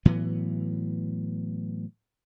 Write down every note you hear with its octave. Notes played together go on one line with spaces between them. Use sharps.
A2 E3 F#3 B3